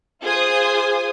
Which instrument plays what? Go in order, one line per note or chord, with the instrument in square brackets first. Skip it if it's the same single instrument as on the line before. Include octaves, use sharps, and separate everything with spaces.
[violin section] F4 G#4 C5 G#5 D#6